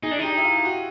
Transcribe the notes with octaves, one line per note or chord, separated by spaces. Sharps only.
D#4 G#4
D4
D#4 G4
E4
F4
G4
F#4